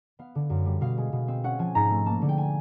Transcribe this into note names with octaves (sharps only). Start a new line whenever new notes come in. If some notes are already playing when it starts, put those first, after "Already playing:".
B3 F5
D3
F#2
G3
B2 F5
G#3
B2
C4
C#4 F#5
F3 G#5
G#2 A#5
A3
A#3 A5
D3
G5
G#5